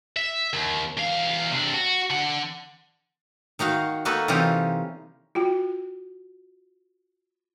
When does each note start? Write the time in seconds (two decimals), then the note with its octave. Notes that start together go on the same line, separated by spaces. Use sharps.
0.16 E5
0.54 D#2
0.97 E2 F5
1.51 C3 D4
1.74 F#4
2.10 D3 F#5
3.59 D#3 D#4 F#4 F5
4.05 A#3 D#4 F#4 A4 B4
4.28 C3 E3 G3 C#4 D#4 F4
5.35 F4 F#4 G5